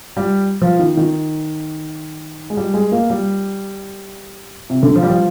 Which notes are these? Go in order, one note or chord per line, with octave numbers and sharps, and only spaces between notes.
G3
F3
D#3
D#3
G#3
G3
G#3
A#3
G3
C3
D3
F3
G3
F3